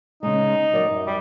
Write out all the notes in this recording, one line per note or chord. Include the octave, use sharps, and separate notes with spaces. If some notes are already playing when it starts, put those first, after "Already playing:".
C#3 G#3 D#4
F#3 A#4 D5
F#2
G3